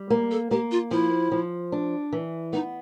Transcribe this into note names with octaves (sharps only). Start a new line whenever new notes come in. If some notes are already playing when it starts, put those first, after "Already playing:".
Already playing: G3
A#3
A4
A#3 G4
F4
F3 E4
F3
D4
E3
B3 D#4